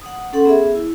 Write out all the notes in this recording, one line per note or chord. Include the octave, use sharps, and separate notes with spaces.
F#5 D#6
C#4 A4 F#5 C6
B3 G#4 E5
E4